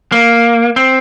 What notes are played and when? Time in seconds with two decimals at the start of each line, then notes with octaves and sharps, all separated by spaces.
0.12 A#3
0.76 C4